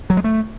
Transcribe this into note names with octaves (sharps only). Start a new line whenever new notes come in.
F#3
G#3
A3